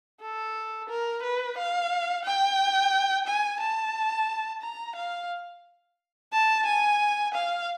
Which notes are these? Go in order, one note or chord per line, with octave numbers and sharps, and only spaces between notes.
A4
A#4
B4
F5
G5
G#5
A5
A#5
F5
A5
G#5
F5